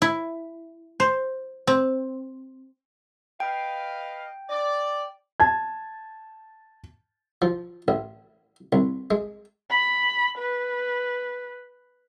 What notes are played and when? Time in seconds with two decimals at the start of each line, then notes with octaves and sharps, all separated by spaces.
0.02 E4
1.00 C5
1.67 C4
3.40 B4 D#5 F5 G5
4.50 D5
5.40 A5 G#6
7.42 F3
7.88 A1
8.73 C2
9.11 G#3
9.70 B5
10.38 B4